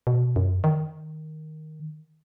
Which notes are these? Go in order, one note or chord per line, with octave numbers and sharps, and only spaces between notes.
B2
F#2
D#3